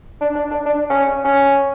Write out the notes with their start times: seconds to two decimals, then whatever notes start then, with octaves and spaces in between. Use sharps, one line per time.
0.21 D4
0.36 D4
0.51 D4
0.66 D4
0.90 C#4
1.24 C#4